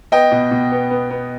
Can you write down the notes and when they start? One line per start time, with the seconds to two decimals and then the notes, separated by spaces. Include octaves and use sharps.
0.12 B3 D#5 G5
0.32 B2
0.51 B2
0.72 B3
0.90 B3
1.10 B3